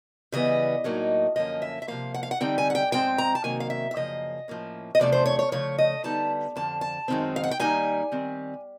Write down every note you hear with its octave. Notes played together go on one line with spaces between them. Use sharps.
C#3 E3 G3 B3 D#5
A2 F#3 A#3 D#4
F#2 D3 F3 A#3 C#4 D#5
E5
E5
C3 F3 A#3 F5
F#5
F5
F#5
D3 G3 C4 D#4 G5
G#5
F#5
G5
G#2 F3 G#3 C4 G5
A#5
A5
C3 D#3 F#3 A#3 G#5
F5
E5
E5
F#2 C#3 F3 A#3 D#5
A2 F3 A#3 C#4
D#5
E2 C3 F3 A3 D4 D5
C5
C#5
C#5
C#3 F3 A3 C#5
D#5
D3 G3 B3 D#4 A5
F2 D3 F3 A5
A5
F#2 D#3 G#3 C4 D#4
F5
F#5
G5
D#3 G3 A#3 D#4 G#5
D#3 G3 C4